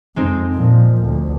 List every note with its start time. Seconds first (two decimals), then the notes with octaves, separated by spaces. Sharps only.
0.16 F2 G#3 C4 D#4
0.55 A#2 F3
1.03 D2